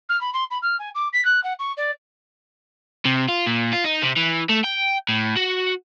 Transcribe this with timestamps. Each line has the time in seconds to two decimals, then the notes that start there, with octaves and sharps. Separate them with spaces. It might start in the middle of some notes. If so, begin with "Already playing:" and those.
0.09 F6
0.21 B5
0.33 C6
0.51 B5
0.62 F6
0.79 G#5
0.95 D6
1.13 B6
1.25 F#6
1.43 F#5
1.59 C#6
1.77 D5
3.05 C3
3.29 F4
3.46 A#2
3.73 F4
3.84 D#4
4.03 C3
4.17 E3
4.50 A3
4.64 G5
5.09 A2
5.36 F#4